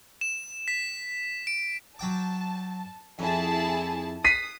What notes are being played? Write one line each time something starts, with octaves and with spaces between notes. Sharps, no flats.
E7
B6
D7
F#3 G5 A5 D6
F2 E4 G#4 A5
D#6 B6 C7 D#7